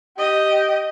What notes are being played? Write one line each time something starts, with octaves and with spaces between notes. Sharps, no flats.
G4 D#5